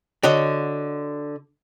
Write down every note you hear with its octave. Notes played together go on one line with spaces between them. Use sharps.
D3 F#4 C#5 D#5